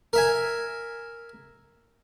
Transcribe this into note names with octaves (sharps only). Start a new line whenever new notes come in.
A#4 E5 G#5